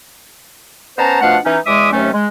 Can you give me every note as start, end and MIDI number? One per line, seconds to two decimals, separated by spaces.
0.99 1.19 59
0.99 1.19 61
0.99 1.19 72
0.99 1.19 81
0.99 1.19 82
1.22 1.38 47
1.22 1.38 53
1.22 1.38 57
1.22 1.38 62
1.22 1.38 77
1.22 1.38 78
1.45 1.58 52
1.45 1.58 61
1.45 1.58 63
1.66 1.90 40
1.66 1.90 52
1.66 1.90 56
1.66 1.90 76
1.66 1.90 86
1.66 1.90 87
1.92 2.09 39
1.92 2.09 48
1.92 2.09 54
1.92 2.09 57
1.92 2.09 61
2.13 2.28 56